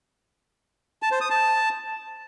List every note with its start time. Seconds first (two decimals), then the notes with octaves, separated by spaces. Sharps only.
1.02 A5
1.12 C5
1.21 D#6
1.30 A5